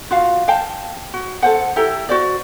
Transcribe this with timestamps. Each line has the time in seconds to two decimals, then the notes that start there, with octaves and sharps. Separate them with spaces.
0.11 F4 F#4 F5
0.48 F5 G5 A5
1.14 F#4
1.42 A4 C5 F#5
1.76 E4 G4 A4 A#5
2.09 F#4 C5 D5